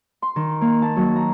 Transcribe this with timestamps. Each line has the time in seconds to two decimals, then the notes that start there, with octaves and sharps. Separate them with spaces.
0.22 C6
0.36 D#3
0.61 A#3
0.82 A5
0.96 F#3
1.16 A#5